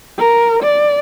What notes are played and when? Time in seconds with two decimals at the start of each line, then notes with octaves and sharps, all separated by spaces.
0.19 A#4
0.63 D5